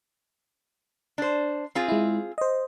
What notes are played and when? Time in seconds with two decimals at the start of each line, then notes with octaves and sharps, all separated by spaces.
1.18 D4 C5
1.75 C4 F4 G#4
1.89 G#3 E4
2.38 C5 D#5